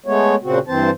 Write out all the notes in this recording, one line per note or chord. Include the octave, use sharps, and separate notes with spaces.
G#3 A3 B3 C#5
A#2 C#3 C4 F#4
G2 E3 C4 C5 A5